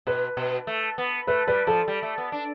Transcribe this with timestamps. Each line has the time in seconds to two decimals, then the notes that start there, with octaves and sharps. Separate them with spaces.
0.07 B2 B4
0.37 B2
0.67 A3
0.98 B3
1.27 A3 B4
1.47 G3 B4
1.67 F3 A4
1.88 G3
2.03 A3
2.18 B3
2.32 D4